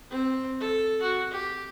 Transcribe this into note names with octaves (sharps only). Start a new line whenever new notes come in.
C4
A4
F#4
G4